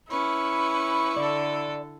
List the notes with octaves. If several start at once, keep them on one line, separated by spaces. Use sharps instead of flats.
C#4 E4 B4 C#6
D3 A4 D5